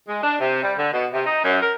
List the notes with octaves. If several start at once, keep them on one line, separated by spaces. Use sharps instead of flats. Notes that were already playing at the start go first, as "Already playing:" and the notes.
G#3
D4
C3
G3
D3
B2
C3
D#4
F#2
A#4